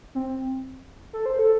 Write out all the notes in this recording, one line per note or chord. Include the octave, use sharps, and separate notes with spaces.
C4
A4
C5
A4